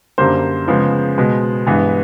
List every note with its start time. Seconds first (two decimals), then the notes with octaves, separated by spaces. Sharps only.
0.18 F#2 D3 G3 A#3 C5
0.68 C#3 F3 G#3 B3
1.17 B2 G#3 B3
1.66 G2 E3 G#3 B3